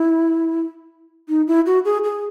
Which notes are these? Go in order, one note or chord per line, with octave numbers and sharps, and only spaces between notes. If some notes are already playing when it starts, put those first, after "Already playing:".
Already playing: E4
D#4
E4
F#4
G#4
G#4